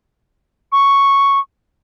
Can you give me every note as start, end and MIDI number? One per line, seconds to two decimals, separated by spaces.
0.72 1.39 85